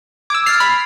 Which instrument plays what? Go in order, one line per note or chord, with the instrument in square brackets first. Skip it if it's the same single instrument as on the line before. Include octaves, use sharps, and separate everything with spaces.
[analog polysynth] D6 E6 [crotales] G#6 D7
[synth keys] F6 C7 [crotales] G#6 A6 F7
[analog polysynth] B5